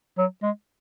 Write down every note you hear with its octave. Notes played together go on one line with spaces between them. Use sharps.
F#3
G#3